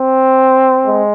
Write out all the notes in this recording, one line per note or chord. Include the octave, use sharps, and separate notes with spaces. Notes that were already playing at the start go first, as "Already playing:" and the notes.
Already playing: C4
G#3